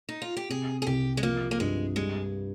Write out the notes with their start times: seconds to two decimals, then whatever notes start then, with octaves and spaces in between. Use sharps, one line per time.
0.09 D#4
0.22 F4
0.37 G4
0.49 C3 G#4
0.82 G#4
0.87 C2 G4
1.17 G#3
1.23 F3 A#3
1.51 A#3
1.60 G2 G#3
1.96 G3 G#3